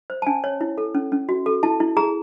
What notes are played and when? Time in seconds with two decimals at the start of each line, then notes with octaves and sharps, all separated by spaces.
0.10 C5
0.22 A5
0.27 C#4 G#5
0.44 C#5
0.61 E4
0.78 A4
0.95 C#4
1.12 C#4
1.29 F#4
1.46 A4
1.63 E4 A5
1.80 E4
1.97 G#4 A#5